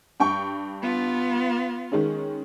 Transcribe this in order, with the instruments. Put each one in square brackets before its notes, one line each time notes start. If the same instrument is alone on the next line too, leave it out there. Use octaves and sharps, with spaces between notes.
[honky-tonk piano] G2 G5 C#6
[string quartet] B3 F4
[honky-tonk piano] D#3 G#3 C#4